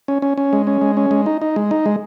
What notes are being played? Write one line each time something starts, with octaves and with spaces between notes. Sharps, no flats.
C#4
C#4
C#4
G#3
C#4
G#3
C#4
G#3
D#4
D#4
G#3
D#4
G#3